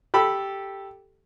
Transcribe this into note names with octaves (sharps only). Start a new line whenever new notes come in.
G4 A4 B5